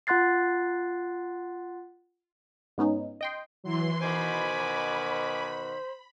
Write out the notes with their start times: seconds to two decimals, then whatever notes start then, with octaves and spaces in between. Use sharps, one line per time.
0.07 F4 F#5 C6 F#6 A6 C7
2.78 G#2 B3 C#4 D#4
3.21 D#5 G5 C6
3.64 E3 F#3 C6
4.00 B2 D#3 F#4 C5 G#5 B5 D6